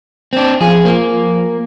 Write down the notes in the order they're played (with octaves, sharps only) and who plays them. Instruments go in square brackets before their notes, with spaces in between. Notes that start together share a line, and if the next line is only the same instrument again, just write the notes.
[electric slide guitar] C4 D4
[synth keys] F3 [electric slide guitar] G#4
[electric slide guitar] A#3